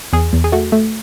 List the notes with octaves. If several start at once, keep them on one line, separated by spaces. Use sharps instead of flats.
E2 G#4
E2
G#4
A3 F#4
A3